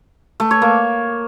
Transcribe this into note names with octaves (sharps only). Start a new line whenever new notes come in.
A3
C#5
A#3